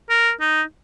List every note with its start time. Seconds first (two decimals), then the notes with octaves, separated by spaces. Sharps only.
0.10 A#4
0.40 D#4